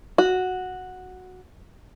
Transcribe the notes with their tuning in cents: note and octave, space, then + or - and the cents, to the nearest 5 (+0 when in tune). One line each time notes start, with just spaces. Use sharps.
F#4 -5